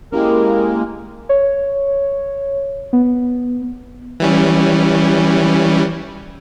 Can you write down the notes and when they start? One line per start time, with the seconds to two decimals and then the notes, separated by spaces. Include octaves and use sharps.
0.12 G#3 A#3 C#4 E4 G4 A#4
1.29 C#5
2.93 B3
4.20 E3 G3 C#4